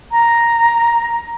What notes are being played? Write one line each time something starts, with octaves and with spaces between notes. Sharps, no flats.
A#5